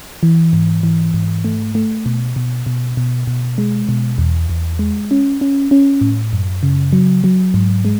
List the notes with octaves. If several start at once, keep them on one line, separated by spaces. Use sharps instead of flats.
E3
G#2
E3
G#2
A3
A3
B2
B2
B2
B2
B2
G#3
B2
E2
E2
G#3
C#4
C#4
C#4
A2
F#2
C#3
F#3
F#3
G#2
G#3